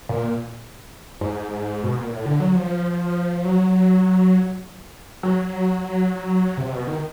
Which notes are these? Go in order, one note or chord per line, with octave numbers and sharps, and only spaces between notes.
A#2
G#2
B2
A#2
A2
D3
F#3
F3
F#3
F#3
C3
B2
D#3